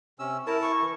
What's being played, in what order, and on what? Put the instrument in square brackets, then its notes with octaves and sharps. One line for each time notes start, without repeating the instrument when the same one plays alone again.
[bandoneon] C3 C#4 E6
[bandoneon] E4 A5 [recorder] A#4
[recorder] C#6
[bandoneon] E3